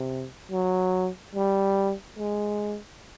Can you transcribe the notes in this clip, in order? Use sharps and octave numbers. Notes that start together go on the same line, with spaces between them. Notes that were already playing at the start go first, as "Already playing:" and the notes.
Already playing: C3
F#3
G3
G#3